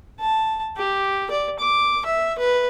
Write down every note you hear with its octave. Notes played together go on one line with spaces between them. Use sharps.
A5
G4
D5
D6
E5
B4